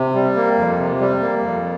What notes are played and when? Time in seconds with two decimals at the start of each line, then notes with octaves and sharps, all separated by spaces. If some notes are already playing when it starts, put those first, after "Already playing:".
Already playing: C3
0.15 G3
0.36 A#3
0.57 F2
0.79 C3
1.00 G3
1.22 A#3
1.43 F2